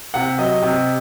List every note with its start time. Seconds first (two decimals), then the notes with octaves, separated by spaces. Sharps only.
0.14 C3 F#5
0.38 F#3 D#5
0.62 C3